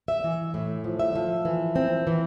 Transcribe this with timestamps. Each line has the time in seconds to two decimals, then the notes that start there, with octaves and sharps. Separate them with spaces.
0.08 E5
0.24 E3
0.54 A2
0.84 F3
0.99 E5
1.15 F3
1.45 E3
1.76 C4
2.07 E3